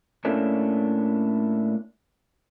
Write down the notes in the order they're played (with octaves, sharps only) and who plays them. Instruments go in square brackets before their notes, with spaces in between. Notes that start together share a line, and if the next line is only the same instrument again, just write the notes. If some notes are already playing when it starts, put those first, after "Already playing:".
[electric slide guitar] A2 A3 A#3 C#4 D4